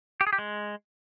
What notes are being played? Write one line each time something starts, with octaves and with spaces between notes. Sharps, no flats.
G4
G#4
G4
G#3